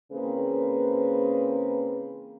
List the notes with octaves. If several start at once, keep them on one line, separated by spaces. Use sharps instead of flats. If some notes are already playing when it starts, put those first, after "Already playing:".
C#3 E3 A#3 C4 G#4 B4